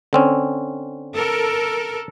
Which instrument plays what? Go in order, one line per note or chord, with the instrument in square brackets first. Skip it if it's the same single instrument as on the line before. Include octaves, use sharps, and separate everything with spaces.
[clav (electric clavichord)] D3 C4 C#4
[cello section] A4 A#4